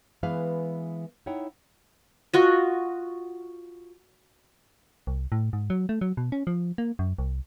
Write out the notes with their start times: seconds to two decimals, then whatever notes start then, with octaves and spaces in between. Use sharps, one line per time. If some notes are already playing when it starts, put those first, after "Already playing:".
0.23 E3 G#3 B3 B4 F5
1.26 D#4 E4 C#5 F#5 G5
2.33 F4 F#4 D#5
5.07 C2
5.32 A2
5.53 G#2
5.70 F#3
5.89 A3
6.01 F#3
6.17 B2
6.32 C#4
6.47 F3
6.78 A#3
6.99 F#2
7.19 C2